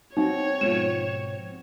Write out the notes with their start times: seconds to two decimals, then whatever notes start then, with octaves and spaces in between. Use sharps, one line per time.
0.17 C4 D#4 F#4 C#5
0.61 G#2 B2 F3 E7